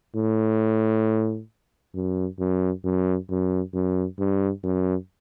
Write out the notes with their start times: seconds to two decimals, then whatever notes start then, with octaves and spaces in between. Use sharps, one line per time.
0.15 A2
1.94 F#2
2.39 F#2
2.84 F#2
3.30 F#2
3.74 F#2
4.19 G2
4.63 F#2